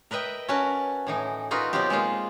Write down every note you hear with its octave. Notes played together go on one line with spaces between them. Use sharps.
A#4 B4 D#5 E5 G5
C#4 F#4 A#4 B4 A5
A2 E3 D#4
D#4 F4 F#4 A#4 B4
B2 F#3 B3 C4 F4 G4
G#3 A#3 F4